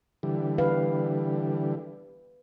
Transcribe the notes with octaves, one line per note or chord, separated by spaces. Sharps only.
D3 E3 G3
B4 F5